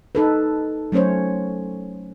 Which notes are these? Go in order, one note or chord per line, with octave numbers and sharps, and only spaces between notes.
D#4 A4 B4
F#3 A3 C#4 C5 C#5